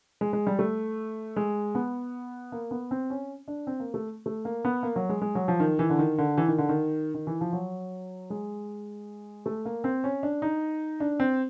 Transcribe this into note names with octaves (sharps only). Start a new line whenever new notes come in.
G#3
G#3
G3
A3
G#3
B3
A#3
B3
C4
C#4
D4
C4
A#3
A3
A3
A#3
B3
A#3
F#3
G#3
G#3
F#3
F3
D#3
E3
D3
D#3
D3
E3
D#3
D3
D#3
D#3
E3
F3
F#3
G#3
A3
A#3
C4
C#4
D4
D#4
D4
C4